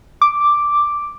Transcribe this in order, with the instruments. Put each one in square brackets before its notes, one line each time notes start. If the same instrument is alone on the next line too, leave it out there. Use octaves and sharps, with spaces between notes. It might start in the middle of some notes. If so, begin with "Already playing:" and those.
[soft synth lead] D6